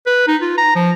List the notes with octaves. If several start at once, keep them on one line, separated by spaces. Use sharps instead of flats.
B4
D#4
F4
A#5
F3